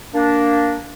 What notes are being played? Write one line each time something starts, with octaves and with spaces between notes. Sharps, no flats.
A#3 D4